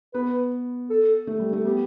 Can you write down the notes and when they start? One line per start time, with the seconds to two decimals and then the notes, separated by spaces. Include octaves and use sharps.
0.14 B3 B4
0.89 A4
1.27 A3
1.39 G3
1.53 A3
1.65 B3 G4